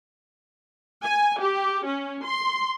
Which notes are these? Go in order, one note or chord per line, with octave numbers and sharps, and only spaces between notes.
G#5
G4
C#4
C6